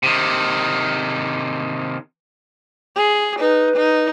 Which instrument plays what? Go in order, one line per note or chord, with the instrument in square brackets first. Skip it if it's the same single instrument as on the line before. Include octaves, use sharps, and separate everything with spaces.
[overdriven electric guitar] C3 D#3
[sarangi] G#4
[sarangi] D#4 [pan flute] B4
[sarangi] D#4